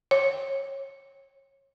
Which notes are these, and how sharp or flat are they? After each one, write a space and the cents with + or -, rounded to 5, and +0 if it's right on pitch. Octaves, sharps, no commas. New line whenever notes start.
C#5 -25